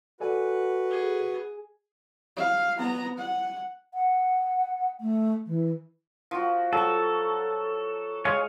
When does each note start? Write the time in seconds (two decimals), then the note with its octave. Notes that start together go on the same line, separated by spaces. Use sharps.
0.20 F#4 A4 B4 D5 G#5
0.90 G#4
2.36 F5
2.77 B3 A#5
3.17 F#5
3.94 F#5
5.00 A3
5.46 E3
6.31 F3 F#4
6.73 F#3 A4 C#6
8.25 G#3 C#5 F5 G#5